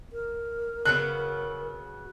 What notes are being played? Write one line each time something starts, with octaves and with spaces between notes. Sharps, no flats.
A#4
C#3 F#3 B3 F#6